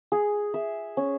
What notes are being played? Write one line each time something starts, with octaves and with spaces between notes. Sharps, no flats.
G#4
E5
C#4